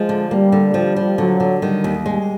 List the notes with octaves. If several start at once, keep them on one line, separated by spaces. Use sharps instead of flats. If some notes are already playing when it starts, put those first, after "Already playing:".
Already playing: F3 G#3
D3
G3 A#3
D3
F3 G3
F3
D3 F#3
D3
D#3 G3
D#2
G3 G#3